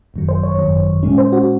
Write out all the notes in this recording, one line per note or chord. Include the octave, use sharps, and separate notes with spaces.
G#1 F#2 D#3 F#3
C5
C#5
G#1 F#2 D#3 F#3
A#2 G#3 C#4
C5
F#4